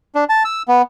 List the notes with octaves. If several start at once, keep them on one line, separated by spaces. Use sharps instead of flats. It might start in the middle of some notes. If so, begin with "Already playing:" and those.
D4
A5
E6
B3